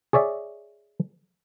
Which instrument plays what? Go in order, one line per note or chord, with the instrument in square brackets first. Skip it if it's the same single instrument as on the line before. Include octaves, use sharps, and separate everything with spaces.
[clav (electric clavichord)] G#4 C#5 D5 E5